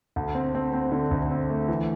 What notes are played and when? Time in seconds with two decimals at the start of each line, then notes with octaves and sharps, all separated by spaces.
0.16 D2
0.35 C4
0.55 C4
0.73 C4
0.92 D3
1.11 D2
1.31 C4
1.50 A3
1.68 E3